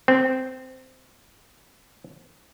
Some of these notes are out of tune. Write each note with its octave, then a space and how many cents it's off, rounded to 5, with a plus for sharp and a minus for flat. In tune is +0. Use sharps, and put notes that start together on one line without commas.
C4 -10